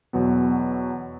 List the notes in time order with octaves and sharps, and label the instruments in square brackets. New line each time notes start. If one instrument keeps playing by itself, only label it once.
[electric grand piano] E2 B2 F#3 B3